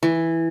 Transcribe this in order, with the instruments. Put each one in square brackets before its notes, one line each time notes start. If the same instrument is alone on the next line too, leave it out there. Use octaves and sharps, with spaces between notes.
[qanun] E3